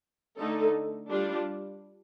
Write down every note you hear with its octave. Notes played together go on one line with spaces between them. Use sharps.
D3 A3 D#4 A4
G3 D4 F4